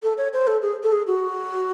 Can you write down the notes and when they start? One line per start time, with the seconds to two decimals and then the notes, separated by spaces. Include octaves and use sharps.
0.03 A4
0.18 C#5
0.33 C5
0.47 A4
0.62 G#4
0.83 A4
0.92 G#4
1.07 F#4